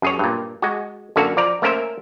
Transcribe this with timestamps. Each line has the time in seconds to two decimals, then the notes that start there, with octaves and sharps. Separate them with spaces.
0.02 F#2 G#4 C#5
0.19 G2 A#2
0.62 G#3 F#4
1.16 F#2 D3 A#3 F#4 A4
1.37 F3 D5 A#5
1.62 A3 A#3 C#4 A#4 C5 E5